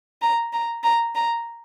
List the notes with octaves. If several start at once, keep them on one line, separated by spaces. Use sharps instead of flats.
A#5
A#5
A#5
A#5